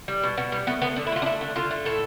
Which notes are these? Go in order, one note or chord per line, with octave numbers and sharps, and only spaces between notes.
G3
B2
B2 B3
G3 B3
A3 B3
D3 B3
D3 D4
E4
A3 F4
D4
A3 E4
D3
D3 F4
A3
A2 A4